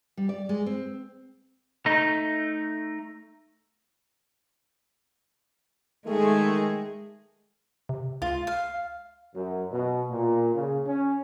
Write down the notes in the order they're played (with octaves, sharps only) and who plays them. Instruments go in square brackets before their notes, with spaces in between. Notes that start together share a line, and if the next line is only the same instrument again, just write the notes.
[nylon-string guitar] G3
D5
G#3
C4
[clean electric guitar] A3 D#4
[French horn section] D#3 A3 [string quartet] G#3 G#4
[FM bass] C3
[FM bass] C#2 [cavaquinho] F4
[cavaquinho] F5
[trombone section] F#2
B2
A#2
C#3
C#4